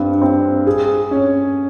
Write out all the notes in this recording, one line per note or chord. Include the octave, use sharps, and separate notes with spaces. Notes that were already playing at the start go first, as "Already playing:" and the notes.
Already playing: G2 C4
C4
G#4
C#4